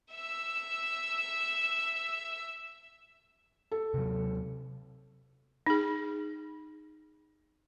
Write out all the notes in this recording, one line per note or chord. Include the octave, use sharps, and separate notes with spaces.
E5 E6
A4
C3 F#3
D#4 G#4